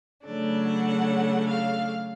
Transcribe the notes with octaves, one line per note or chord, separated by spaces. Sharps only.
C#3 F#3 A3 D4 D5
F#5
F5